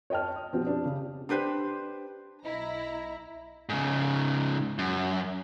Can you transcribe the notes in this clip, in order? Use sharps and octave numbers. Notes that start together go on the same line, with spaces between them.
C#5 D#5 G5 A5 F6
D#6
B2 F3 C4 C#4 G4
D4 G4
C#3
D4 G4 B4 C5
B1 E4 D#5 A#5
G#2 C#3
F#2